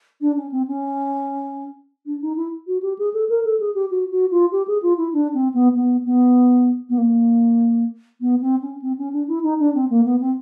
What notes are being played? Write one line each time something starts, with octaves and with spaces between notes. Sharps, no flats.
D4
C#4
C4
C#4
D4
D#4
E4
F#4
G4
G#4
A4
A#4
A4
G#4
G4
F#4
F#4
F4
G4
G#4
F4
E4
D4
C4
B3
B3
B3
B3
A#3
B3
C4
C#4
C4
C#4
D4
E4
D#4
D4
C4
A#3
B3
C4